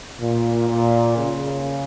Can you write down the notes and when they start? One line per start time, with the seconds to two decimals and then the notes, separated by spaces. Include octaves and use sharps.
0.20 A#2
0.69 A#2
1.18 C#3